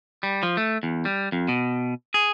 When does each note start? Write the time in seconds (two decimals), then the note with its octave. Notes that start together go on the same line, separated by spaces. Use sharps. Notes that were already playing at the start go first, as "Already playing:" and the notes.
0.23 G3
0.43 F3
0.57 A3
0.83 E2
1.05 G3
1.32 F2
1.48 B2
2.14 G#4